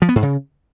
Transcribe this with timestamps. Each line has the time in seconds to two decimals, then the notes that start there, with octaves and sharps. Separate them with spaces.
0.02 F3
0.09 B3
0.16 G#2
0.22 C#3